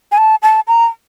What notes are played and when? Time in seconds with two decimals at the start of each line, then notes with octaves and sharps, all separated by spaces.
0.12 G#5
0.18 A5
0.43 A5
0.68 A#5